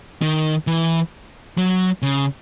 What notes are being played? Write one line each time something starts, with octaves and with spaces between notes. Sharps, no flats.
D#3
E3
F#3
C#3